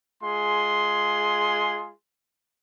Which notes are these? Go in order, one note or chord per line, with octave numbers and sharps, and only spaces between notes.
G#3 F4 G#4 C6